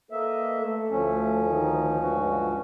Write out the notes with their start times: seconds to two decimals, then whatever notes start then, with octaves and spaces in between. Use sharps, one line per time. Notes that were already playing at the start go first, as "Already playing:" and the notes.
0.12 A#3 A4 B4 D#5 E5
0.60 A3
0.91 D2 F3 C#4
1.48 D#3 D#4
2.00 C#2 G2 F#4